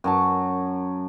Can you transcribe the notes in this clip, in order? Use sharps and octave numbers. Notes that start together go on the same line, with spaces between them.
F#2 F#3 A5